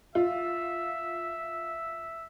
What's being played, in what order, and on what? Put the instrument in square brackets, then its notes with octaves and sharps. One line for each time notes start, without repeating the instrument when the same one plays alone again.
[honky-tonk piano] F4 [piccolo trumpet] E5